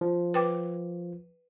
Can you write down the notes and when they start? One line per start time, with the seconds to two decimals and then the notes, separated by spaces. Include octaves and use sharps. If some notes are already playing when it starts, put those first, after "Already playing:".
0.01 F3
0.34 B4 G5 D6